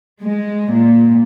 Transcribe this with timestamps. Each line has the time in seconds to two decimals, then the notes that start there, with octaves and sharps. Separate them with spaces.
0.23 G#3
0.74 A#2